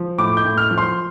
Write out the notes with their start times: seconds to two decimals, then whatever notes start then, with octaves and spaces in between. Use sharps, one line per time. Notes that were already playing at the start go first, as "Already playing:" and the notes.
Already playing: F3
0.18 A2 D6
0.37 G6
0.45 A2
0.58 F6
0.71 F3
0.78 C6